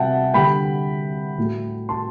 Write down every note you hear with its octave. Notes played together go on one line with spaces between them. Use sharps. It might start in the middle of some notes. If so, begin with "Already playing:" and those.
Already playing: C3 G3 E5 F#5 G5 A5
D3 G3 G5 B5
A2 F#3 A3
A5 C6